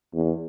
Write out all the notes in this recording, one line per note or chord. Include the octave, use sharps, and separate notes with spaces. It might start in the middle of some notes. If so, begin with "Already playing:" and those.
E2